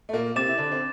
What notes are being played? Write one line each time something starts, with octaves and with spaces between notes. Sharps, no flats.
A3
A#2 A#3
C3 C4 D6 A6 E7
E4
D3 D4
C4